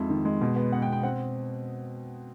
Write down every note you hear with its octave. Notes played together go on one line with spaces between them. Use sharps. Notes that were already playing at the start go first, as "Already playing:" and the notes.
Already playing: F2 G#3 D#4 E5
D#3
G#3
B2
B3
B3 F#5
G5
B2
G5
C4 F#5